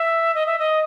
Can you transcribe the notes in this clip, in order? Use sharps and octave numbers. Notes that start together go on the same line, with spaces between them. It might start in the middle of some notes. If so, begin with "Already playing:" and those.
Already playing: E5
D#5
E5
D#5